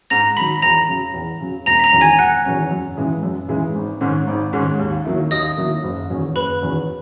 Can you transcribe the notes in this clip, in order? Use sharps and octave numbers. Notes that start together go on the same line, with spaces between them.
G#2 A#5 A#6
D#3 F#3 B5 B6
E2 A#5 A#6
C#3 F#3
E2
C#3 F#3
E1 A#5 A#6
B6
A#5 A#6
E2 D#3 F#3 C#4
G#5 G#6
E1 F#5 F#6
E2 D#3 F#3 C#4
F#2
C#3 E3 G#3
F#2
C#3 E3 G#3
G#1
G#2 D#3 G#3 C#4
G#1
G#2 D#3 G#3 C#4
D#2
D#3 F#3 A#3 E4
D#2 D#5 D#6
D#3 F#3 A#3 E4
F#1
E2 D#3 F#3 C#4
F#1 B4 B5
E2 D#3 F#3 C#4